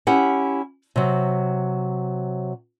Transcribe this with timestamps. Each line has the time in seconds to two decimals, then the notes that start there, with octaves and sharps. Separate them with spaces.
0.07 C#4 E4 G4 F#5
0.96 C3 F#3